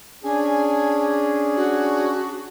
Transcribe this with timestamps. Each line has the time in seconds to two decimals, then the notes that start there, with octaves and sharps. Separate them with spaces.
0.24 C#4 D4 G#4 G#5
1.56 F#4